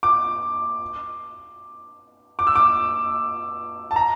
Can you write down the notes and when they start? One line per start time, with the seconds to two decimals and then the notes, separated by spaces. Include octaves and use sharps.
0.03 D6
2.39 D6
2.47 E6
2.55 D6
3.91 A5
3.96 A#5